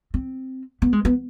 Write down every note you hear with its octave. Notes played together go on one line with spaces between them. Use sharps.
C4
B3
G#3
B3